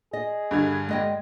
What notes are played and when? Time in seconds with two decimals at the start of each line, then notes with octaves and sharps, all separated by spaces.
0.13 G#4 D#5
0.51 G2 D3 G#6
0.89 G#3 D#5 G5